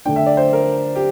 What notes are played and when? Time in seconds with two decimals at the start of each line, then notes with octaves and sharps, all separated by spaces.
0.05 D3 A3 D4 G5
0.16 E5
0.26 D5
0.37 C5
0.53 A#4
0.95 G4